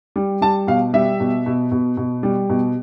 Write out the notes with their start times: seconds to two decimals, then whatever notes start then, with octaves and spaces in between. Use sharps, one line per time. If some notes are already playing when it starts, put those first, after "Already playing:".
0.16 G3
0.42 G3 A5
0.67 B2 F5
0.93 G3 E5
1.20 B2
1.46 B2
1.71 B2
1.97 B2
2.23 G3
2.50 B2